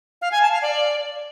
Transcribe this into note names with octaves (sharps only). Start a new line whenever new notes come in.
F5
G#5
A5
F5
D5